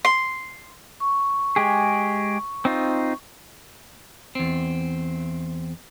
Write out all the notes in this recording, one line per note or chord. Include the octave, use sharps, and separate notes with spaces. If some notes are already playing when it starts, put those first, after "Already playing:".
C6
C#6
G#3 G4 G#4
C4 D#4 F4
E2 C4